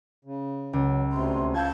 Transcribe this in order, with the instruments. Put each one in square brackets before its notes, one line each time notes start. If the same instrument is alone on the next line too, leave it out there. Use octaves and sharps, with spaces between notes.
[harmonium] C#3
[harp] C#2 [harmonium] F#3
[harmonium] D2 C3 [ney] C6
[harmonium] F4 [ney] A5 [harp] G6 G#6